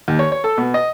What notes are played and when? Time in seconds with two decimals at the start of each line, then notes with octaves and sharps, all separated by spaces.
0.08 D#2
0.19 C#5
0.32 C#5
0.44 A4
0.58 B2
0.74 D#5